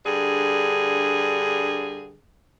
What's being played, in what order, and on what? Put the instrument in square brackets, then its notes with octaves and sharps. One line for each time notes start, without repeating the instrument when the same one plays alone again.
[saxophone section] G2 D3 G#4